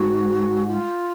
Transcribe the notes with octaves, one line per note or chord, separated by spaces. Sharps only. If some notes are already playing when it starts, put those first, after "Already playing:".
Already playing: G#2 F#4
F4